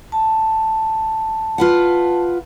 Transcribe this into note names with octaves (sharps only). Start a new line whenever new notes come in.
A5
F4 B4 F#5